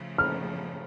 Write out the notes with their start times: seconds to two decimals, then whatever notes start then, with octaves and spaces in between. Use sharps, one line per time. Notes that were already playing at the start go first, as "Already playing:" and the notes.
Already playing: C#3 F3 A3
0.18 F6